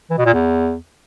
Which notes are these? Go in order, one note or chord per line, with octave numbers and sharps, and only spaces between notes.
E3
B2
A#2
E2